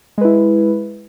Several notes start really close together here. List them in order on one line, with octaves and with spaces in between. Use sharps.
G#3 B4 E4